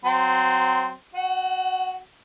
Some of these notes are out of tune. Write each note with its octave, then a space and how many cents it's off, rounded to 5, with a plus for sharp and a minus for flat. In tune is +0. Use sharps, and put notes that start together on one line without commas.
F#3 +0 C4 -20 C5 +0
F#4 +0 F#5 +30